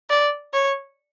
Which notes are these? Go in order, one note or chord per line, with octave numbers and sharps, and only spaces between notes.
D5
C#5